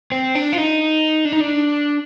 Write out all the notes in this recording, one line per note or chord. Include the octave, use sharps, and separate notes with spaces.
C4
D4
F4
D#4
D4
D#4
D4